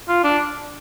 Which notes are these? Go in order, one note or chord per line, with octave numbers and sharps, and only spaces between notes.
F4
D4